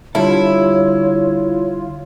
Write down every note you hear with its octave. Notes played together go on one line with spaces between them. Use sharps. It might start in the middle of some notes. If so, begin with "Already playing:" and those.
D3 G3 E4 F4 A4 C#5